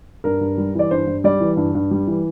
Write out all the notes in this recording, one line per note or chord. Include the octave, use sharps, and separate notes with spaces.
G2 A#4
G2
G3
E3 D5
G2 C5
G2
G3 D5
E3
G2
G2
G3
E3